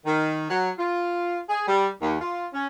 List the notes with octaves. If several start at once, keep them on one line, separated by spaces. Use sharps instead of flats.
D#3
F#3
F4
G#4
G3
D#2
F4
C#4